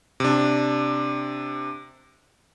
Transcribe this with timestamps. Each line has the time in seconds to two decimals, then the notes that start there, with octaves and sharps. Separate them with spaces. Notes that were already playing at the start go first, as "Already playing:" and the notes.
0.20 C3 D4